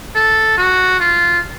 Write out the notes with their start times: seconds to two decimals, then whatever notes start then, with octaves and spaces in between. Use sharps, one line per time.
0.15 A4
0.57 F#4
1.00 F4